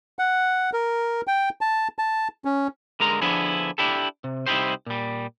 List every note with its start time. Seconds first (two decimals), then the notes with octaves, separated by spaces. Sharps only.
0.19 F#5
0.73 A#4
1.27 G5
1.61 A5
1.99 A5
2.45 C#4
3.00 D3 G#3 A#4 A#5
3.22 D3 F3 B3 D4 E4 G#4
3.78 D4 E4 G4 A4
4.24 C3
4.46 C2 D#4 E4 G4 C5
4.86 A#2 G3